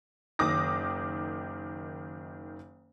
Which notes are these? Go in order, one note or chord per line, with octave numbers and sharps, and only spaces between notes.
F#1 D#3 D6 D#6 A#6